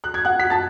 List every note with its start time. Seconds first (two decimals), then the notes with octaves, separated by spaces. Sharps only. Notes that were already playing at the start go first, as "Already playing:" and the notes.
0.04 F#6
0.14 G#6
0.25 F#5 F#6
0.40 B6
0.50 A5 A6